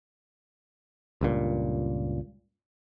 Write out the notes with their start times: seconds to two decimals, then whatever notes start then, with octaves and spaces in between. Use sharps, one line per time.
1.21 C#2 G2 A#2